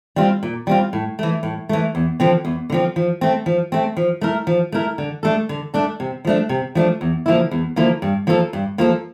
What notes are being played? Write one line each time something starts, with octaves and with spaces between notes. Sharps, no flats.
G3 C4 F4
A#2
G3 C4 F4
A2
E3 A3
A2
E3 A3
E2
D3 F3 C4
E2
D3 F3 C4
F3
A3 C4
F3
A3 C4
F3
A3 E4 A#4
F3
A3 E4 A#4
D3
A3 D4 A4
D3
A3 D4 A4
C3
F3 A3 D4
C3
F3 A3 D4
E2
D3 F3 A#3 E4
E2
D3 F3 A#3 E4
G2
F3 A#3 F4 A4
G2
F3 A#3 F4 A4